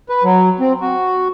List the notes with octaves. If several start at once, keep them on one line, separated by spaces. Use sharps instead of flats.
B4
F#3
C4
F#4